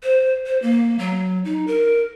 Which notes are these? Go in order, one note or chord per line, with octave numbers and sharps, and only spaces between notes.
C5
C5
A#3
F#3
D#4
A#4